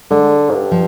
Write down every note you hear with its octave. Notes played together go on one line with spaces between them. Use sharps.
D3 G#3
G#2
G2
F3